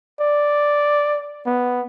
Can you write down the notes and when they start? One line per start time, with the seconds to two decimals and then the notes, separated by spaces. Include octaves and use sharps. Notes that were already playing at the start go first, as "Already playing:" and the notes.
0.20 D5
1.46 B3